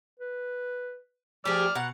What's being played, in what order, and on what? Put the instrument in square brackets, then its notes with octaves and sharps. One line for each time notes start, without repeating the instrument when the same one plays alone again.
[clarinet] B4
[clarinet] F3 [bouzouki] G4 G#4 [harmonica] D5 F6
[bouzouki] B2 F#5 [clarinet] A#5